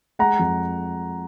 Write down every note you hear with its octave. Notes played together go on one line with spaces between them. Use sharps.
G#3 F#5 A#5
F2